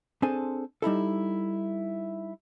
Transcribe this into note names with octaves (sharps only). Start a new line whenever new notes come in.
C4 D4 G#4 A4 C5 G#5
G3 D#4 E4 A4